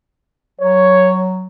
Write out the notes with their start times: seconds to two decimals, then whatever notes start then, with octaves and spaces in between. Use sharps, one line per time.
0.60 F#3 C#5